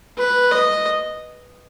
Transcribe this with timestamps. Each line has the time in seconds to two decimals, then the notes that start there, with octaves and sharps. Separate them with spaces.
0.18 B4
0.51 D#5